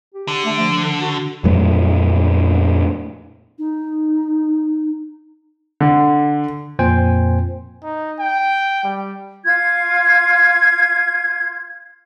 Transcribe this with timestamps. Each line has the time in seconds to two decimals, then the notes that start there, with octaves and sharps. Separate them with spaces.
0.14 G4
0.28 D3
0.44 A3
0.59 F3
1.00 F#4
1.44 F2 A#2 F#3 A3
3.59 D#4
5.80 D3
6.79 F2 A#2 C5 G5 G#5
7.83 D#4
8.20 G5
8.84 G3
9.44 F4 G#6